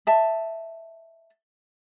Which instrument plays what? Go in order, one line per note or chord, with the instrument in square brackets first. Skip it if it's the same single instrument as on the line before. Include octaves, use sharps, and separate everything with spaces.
[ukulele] D#5 E5 A5